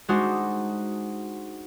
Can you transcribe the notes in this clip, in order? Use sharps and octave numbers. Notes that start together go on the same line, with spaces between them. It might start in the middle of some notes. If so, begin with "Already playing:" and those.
G#3 D4 D#4 F#4 C5